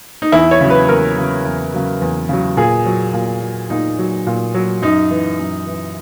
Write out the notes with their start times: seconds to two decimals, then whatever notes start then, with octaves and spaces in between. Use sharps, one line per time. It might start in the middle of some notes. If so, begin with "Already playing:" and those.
0.22 D#4
0.32 E2 E4
0.51 C#5
0.61 C#3 F#3
0.70 B4
0.89 E2 A#4
1.17 C#3 F#3
1.46 E2
1.74 C#3 F#3
2.01 E2
2.29 C#3 F#3
2.57 A#2 G#4
2.86 F#3
3.14 A#2
3.42 F#3
3.70 A#2 D#4
3.99 F#3
4.27 A#2
4.55 F#3
4.82 F#2 D#4
5.11 E3
5.39 F#2
5.67 E3